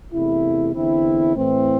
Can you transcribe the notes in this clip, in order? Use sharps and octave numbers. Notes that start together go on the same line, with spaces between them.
E2 C3 A3 E4
E2 D3 C4 E4
A2 E3 C4